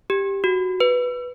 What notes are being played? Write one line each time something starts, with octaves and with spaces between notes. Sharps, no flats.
G4
F#4
B4